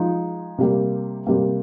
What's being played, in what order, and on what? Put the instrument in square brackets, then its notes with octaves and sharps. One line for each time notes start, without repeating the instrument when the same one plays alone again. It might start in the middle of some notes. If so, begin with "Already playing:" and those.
Already playing: [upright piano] F3 G#3 D#4 G#4
C3 G3 A#3
C3 G3 A#3